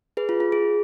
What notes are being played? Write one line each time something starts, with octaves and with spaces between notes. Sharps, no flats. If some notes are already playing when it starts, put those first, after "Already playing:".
G#4 B4
F4
F4
G#4